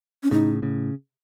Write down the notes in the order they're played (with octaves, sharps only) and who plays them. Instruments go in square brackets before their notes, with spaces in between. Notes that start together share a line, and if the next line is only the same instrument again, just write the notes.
[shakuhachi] C#4
[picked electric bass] A2 C#3 [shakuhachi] D#4
[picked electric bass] A2 C#3